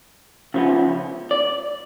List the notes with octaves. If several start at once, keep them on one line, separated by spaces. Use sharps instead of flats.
C#3 F3 B3
D5